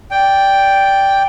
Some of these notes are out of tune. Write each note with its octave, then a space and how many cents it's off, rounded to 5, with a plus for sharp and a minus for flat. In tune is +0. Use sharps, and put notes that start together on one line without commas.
D5 -10 G5 +0